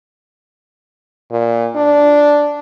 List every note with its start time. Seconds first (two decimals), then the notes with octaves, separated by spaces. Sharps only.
1.31 A#2
1.76 D4